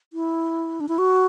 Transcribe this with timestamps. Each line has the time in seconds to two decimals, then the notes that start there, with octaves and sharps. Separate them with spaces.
0.13 E4
0.80 D4
0.88 E4
0.98 F#4